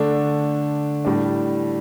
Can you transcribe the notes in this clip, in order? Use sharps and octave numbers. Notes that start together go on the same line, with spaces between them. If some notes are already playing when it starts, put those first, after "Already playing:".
Already playing: D3 A3 D4
A2 G3 D4